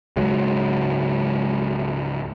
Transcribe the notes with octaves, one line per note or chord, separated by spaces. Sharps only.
C#2 G#2 F#3 G#3